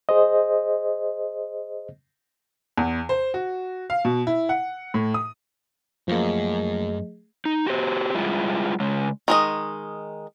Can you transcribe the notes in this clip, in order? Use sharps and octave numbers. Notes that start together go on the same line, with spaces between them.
G#4 C5 D#5
E2
C5
F#4
F5
B2
E4
F#5
A2
D#6
F#2 F3 A3 A#3 G#4 D#5
D#4
F#4 G4 C5
G3 G#3 E4 F4
C#3 G#3
D#3 G#3 D#5